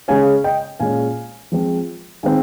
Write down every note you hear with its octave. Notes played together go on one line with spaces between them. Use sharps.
C#3 G#3 C#4 F5 G#5
D#5 G5
A#2 G#3 C#4 F5 G#5
F3 G#3 C4
D#3 G#3 C4 F5 G#5